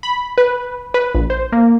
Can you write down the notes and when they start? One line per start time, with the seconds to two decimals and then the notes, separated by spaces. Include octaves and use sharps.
0.03 B5
0.38 B4
0.94 B4
1.15 A#1
1.30 C5
1.52 A#3